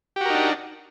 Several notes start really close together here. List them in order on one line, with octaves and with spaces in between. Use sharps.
G4 F#4 A#4 D#4 D4